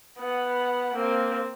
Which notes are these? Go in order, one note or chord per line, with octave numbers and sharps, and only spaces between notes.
B3 F#5
A#3 C4